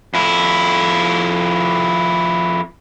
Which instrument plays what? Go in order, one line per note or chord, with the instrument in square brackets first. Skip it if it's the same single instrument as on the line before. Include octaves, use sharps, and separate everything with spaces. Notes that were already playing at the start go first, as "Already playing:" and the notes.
[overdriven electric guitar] F2 E4